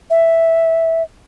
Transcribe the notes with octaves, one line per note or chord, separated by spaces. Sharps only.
E5